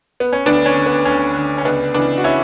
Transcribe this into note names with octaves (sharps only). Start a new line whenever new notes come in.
B3
C#4
D2 B3 D4
C#4
D3
B3
D2 C#4
D3
C#4
C#2 B3 D4
C#3 E3 B3 D4
F#4
C#4 E4